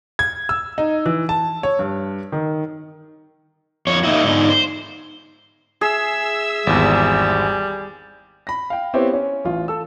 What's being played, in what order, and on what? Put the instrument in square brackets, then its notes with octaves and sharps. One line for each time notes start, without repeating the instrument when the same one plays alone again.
[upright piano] G#6
E6
D#4
E3
A5
C#5
G2
D#3
[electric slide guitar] F2 C#5
A#3 D#4 E4 F#4
G#2 D3 D#4
C5
[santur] G#4 [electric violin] E5 E6
[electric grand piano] G#1 E2 [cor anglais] G3
[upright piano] B5 A#6
F5 G5
B3 C4 E4 G4 C5 C#5
C#4
A1 F4
A4 E6